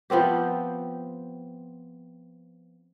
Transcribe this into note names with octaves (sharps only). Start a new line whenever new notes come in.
F3 B3 C4 G4